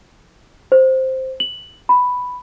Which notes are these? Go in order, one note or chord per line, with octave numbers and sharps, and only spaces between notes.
C5
F#7
B5